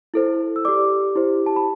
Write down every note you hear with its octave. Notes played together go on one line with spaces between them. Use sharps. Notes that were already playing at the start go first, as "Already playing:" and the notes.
E4 A4 C5
E6
G4 D5 D6
E4 G4 C5
A5
B5